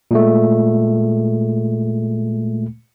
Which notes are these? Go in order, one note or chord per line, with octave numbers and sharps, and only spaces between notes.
A#2 G#3 A3